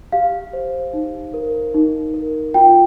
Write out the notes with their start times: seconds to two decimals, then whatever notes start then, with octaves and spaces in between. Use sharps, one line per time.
0.12 G4 F5
0.53 C5
0.93 D#4
1.34 A#4
1.74 D#4
2.14 A#4
2.54 F4 G5